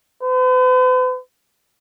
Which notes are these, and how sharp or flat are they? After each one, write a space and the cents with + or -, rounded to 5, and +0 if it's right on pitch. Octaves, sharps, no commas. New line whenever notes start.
B4 +45